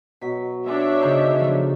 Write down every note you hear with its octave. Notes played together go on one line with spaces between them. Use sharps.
B2 F#3 F#5 B6
D4 C#5 E5
C#3 D#4 C5
F3 A3